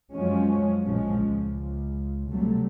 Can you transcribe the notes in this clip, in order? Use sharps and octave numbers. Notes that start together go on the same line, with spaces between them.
F#2 F3 F#3 G#3 C#4
A#1 F3 G#3 C#4
C#2
C3 F#3 G3 A3